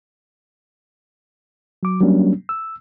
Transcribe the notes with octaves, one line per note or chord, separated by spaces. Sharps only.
F#3 D6
F#3 G3 A#3 C#4 D4
E6